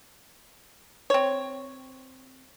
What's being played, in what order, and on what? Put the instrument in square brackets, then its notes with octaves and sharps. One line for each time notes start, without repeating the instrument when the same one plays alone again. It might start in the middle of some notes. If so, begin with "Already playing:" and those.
[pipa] C4 C#5